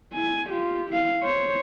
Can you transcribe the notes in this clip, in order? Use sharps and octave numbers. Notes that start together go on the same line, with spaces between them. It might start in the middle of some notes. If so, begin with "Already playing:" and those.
E4 G#5
F4 G4
E4 F5
C5 C#5